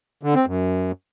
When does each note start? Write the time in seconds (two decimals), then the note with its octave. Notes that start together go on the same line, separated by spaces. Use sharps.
0.23 D3
0.35 C4
0.46 F#2